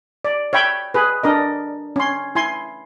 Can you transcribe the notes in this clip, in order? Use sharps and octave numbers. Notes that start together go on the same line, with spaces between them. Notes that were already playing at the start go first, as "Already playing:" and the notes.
D5
C#5 E5 G5 B5
G#4 B4
D4 A#4 D#5
C#4 C6
E4 G#5 C6